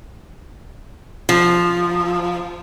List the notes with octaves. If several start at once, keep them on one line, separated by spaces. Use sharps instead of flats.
F3